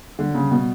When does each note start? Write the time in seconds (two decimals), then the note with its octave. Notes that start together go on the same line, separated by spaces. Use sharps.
0.19 D3 G3
0.30 C#3 F#3
0.40 G3
0.51 B2